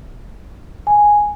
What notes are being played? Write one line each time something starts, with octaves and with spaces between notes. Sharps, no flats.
G#5